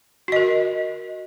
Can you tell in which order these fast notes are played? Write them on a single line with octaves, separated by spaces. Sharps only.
F#4 D#5 A#4